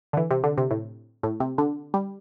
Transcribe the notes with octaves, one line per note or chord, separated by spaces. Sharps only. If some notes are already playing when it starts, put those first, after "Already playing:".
D3
E3
C3
D3
C3
A2
A2
C3
D3
G3